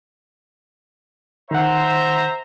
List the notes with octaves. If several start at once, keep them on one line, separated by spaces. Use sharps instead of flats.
D#3 C5 E5 F#5 A#5